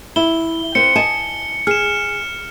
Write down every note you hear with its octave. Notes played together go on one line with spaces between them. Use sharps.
E4 G7
C4 B4 C#7
D#5 G#5 A5
G#4 F6 E7